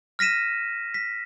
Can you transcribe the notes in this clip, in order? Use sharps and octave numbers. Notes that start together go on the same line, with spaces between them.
F6 A#6 B6 D#7 E7
B6